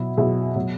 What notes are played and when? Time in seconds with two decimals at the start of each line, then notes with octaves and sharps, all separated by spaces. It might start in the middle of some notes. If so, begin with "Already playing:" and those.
Already playing: B2 F#3 E4
0.17 B2 F#3 E4 G#4
0.56 B2 F#3